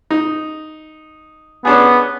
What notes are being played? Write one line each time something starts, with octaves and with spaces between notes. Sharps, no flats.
D#4
B3 C#4 D4 G#4